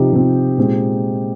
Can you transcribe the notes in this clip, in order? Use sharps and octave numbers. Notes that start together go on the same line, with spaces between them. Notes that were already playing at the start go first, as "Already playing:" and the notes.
Already playing: C3 F3 C4 D#4 G4
C3 F3 C4
A#2 G#3 C4